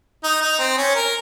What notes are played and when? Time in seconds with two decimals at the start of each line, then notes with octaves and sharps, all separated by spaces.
0.24 D#4
0.41 D#4
0.59 C4
0.77 C#4
0.95 A#4